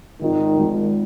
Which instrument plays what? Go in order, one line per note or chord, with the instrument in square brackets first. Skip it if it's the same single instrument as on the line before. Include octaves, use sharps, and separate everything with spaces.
[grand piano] G#1 G#2 F3 [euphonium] D#3
[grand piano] G#1 G#2 F3